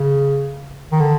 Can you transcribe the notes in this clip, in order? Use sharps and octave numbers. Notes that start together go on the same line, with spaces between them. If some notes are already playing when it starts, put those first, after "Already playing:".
Already playing: C#3
D#3
D3